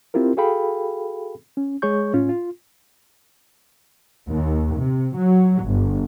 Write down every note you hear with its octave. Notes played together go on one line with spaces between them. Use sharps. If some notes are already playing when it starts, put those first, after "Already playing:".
C4 E4 F4 G4 A#4
F#4 G#4 A4 F5 G5 B5
C#4
G#3 G#4 C#5 C#6 G6
A2 C#4 F4
F4
D#2
C3
F#3
G1